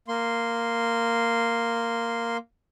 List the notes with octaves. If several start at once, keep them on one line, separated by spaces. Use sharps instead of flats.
A#3 C6